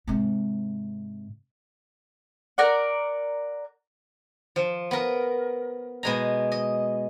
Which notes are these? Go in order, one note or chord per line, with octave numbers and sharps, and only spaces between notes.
G#2 C3
A#4 D5 F#5
F3
B3 A#4
B2 G#3 A#5
D#5